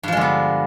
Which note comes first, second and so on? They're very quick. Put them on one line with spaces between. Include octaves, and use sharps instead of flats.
G2 F3 G#3 D3 B3